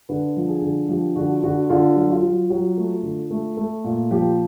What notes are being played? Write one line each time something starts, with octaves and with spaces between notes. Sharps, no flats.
D3 B4
F3
G#4
D3
F3 G4
D3 F#4
D3 F#4
D3 F4
F#3
F4
F#3
F#3
A3
D3
A3
A3
A#2
F3 G4